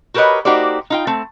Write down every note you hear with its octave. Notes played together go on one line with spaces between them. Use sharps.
F#4 G4 A#4 B4 C#5 D#5
A#3 D#4 F#4 G4 C5 D5
D#4 F4 G5
A3 C4